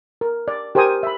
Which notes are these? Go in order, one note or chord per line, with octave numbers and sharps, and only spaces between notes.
A#4
D5
G4 A#4 C5 G5 G#5 D#6
E5 B5